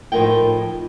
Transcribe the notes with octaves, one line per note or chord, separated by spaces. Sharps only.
A2 F3 D#4 A#4 D#5 G5